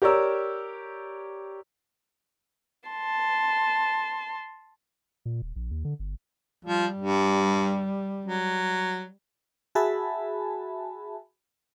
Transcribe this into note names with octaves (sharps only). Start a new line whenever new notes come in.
G4 A#4 C#5 D5 E6
A5 C6
A#2
D#1
A#1
D#2
D3
G1
F3 G3
G2
F#3
F#4 G#4 E5 G#5 A5 B5